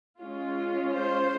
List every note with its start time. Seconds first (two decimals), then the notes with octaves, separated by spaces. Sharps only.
0.20 G#3 C#4 F4
0.94 C5